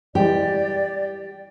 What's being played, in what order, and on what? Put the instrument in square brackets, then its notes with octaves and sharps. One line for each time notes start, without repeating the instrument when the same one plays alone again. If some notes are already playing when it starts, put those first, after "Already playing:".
[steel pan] E3 G3 G#3 [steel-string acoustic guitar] G4 [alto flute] D5